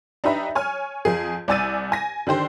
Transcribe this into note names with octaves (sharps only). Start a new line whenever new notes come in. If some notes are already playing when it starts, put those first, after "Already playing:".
D4 D#4 G4 B4 E5 A#5
C#5 G#5 F6
F2 G#4
C2 D5 G#5 E6 A6 D#7
G#5 A#6
D3 D#3 G4 C5